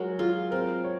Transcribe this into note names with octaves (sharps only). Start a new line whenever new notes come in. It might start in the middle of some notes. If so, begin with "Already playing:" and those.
Already playing: F#3 G#3 A#4
F4 G#4
C4 A#4
C#5